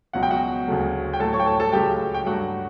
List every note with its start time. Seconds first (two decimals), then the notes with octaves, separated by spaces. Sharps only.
0.13 C#2 B2 F#3 F#5
0.23 G5
0.31 F#4 F#5
0.68 D2 C#3 F#3 A3
1.13 G5
1.20 A2 F#3 A3 A4 A5
1.33 C#5 C#6
1.40 G5
1.46 A4 A5
1.60 A4 A5
1.72 C#2 C#3 F#3 A3 G4 G5
2.14 G5
2.26 G2 F#3 A3 F#4 F#5